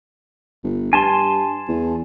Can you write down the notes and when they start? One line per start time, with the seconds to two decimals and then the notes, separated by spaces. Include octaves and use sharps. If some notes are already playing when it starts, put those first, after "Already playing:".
0.64 G1
0.93 G2 G#5 A5 C6
1.68 E2